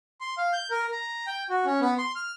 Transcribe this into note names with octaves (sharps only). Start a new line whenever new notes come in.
C6
F5
G6
A#4
A#5
G5
F#4
C#4
B3
C6
F6